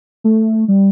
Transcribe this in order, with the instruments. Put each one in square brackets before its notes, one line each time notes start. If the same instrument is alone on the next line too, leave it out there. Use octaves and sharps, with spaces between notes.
[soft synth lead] A3
G3